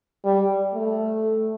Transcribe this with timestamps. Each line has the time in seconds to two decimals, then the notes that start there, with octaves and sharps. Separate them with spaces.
0.25 G3
0.74 A3